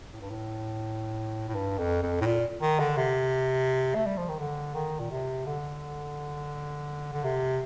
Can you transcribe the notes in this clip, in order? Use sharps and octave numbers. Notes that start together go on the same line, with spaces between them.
A2
G2
A2
A2
G2
F2
F2
A2
A#2
D#3
D3
C3
A3
G3
F3
D#3
D3
D#3
A#2
C3
D3
D3
C3